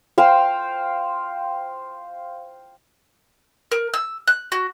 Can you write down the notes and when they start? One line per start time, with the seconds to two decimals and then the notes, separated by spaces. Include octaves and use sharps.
0.18 C5 F5 G5 C6
3.72 A#4
3.94 E6
4.28 F#6
4.52 F#4